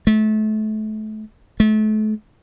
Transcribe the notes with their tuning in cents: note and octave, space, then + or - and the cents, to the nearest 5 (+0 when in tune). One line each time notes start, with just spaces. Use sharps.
A3 -30
A3 -35